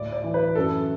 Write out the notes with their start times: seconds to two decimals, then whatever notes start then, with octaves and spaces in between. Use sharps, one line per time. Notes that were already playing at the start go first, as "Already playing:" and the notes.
Already playing: D2 A2 D5
0.13 D5
0.24 E3
0.34 B4
0.55 F#2 A4